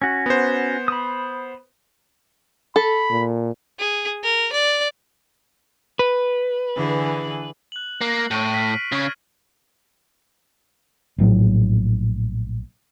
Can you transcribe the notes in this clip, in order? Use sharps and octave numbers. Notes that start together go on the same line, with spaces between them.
C#4 F#4
B3 C5
B5 D#6
A4 B5
A#2
G#4
A#4
D5
B4
D3 E3 G#4
F#6 F#7
A#3 A#6 C7
A2 C#6 D7 D#7
F6 B6
C#3 C#6 F6 G#6
A#1 A2 F#3